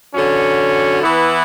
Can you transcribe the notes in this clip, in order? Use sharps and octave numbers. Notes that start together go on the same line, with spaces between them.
D3 F#3 C#4
E3 B3 E4